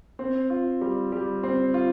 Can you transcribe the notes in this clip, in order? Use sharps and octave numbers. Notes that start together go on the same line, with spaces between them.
C4
F4
G3
G3
C4
F4